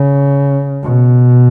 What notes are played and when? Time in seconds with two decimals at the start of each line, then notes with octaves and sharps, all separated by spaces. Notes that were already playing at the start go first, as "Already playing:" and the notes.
Already playing: C#3
0.83 B2